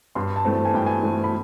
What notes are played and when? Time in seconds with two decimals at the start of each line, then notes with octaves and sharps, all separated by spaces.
0.15 G2 C6
0.36 A5
0.45 E3 A3 C4
0.55 A5
0.65 G#5
0.74 G2 G5
0.86 G#5
1.03 E3 A3 C4
1.24 B5